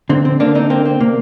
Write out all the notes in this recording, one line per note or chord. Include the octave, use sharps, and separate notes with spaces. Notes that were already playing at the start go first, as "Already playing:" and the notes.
D3 C4
C4
D3 A#3 D4
C4 D#4
A#3 C4
C4
C3 A#3